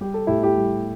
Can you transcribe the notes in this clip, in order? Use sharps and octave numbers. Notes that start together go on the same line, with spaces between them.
G3 G4
A4
A2 E4 G4
E4 G4
G3